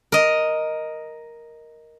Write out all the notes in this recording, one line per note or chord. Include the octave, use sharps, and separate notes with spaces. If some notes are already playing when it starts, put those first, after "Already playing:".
A#4 D#5